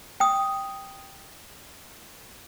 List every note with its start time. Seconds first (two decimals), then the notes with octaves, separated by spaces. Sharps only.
0.20 G5 D#6